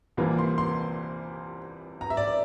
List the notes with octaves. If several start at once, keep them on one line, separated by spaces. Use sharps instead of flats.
C2 C3 E3 A#3 F4
C6
C6
A#5
E5
D5